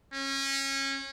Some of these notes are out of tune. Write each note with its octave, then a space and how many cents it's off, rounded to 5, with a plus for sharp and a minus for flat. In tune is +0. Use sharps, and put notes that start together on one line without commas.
C#4 -25